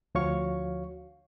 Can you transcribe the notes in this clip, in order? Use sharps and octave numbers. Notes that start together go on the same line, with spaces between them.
D2 F3 F#4 C#5 F5 C#6